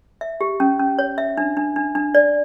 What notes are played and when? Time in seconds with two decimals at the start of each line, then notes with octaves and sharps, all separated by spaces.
0.21 E5
0.41 G4
0.60 C#4
0.79 C#4
0.99 C#5
1.18 E5
1.38 D4
1.57 D4
1.76 D4
1.95 D4
2.15 D5